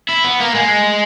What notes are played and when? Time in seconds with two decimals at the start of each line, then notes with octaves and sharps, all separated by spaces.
0.09 E4
0.24 B3
0.40 A#3
0.54 G#3